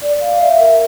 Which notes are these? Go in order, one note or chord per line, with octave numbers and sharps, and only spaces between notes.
D5
F5
E5
A#4